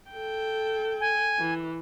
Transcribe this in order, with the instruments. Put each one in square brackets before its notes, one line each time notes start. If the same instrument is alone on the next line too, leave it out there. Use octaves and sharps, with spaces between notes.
[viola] A4 G5
[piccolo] G#5
[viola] E3